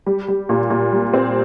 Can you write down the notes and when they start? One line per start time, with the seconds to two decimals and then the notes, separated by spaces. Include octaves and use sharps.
0.06 G3
0.28 G3
0.49 A#2
0.70 A#2
0.92 G3
1.14 C4